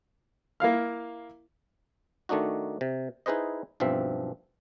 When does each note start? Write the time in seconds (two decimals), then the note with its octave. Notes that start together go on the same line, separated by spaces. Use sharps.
0.60 A#3 E4 F5 F6
2.29 D#3 A3 D4 D#4 F#4
2.81 C3
3.26 D#4 E4 G#4 B4 C5 D#5
3.80 B1 G2 F3 C4 E5